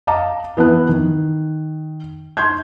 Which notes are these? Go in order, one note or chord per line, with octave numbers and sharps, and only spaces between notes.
D#5 F5 A5 A#5 D6
E3 B3 A5 F#6
D#3
C6 G6 G#6